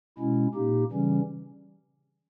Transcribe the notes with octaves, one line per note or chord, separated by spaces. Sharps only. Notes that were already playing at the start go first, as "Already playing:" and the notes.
B2 G#3 C#4 E4
A#2 A#3 D#4 G4
C#3 E3 G3 C#4